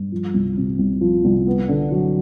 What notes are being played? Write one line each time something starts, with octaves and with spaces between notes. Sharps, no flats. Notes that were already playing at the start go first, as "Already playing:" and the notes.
Already playing: G2
F3
C2
C3
C2
F3
C2
B3
D3
F#3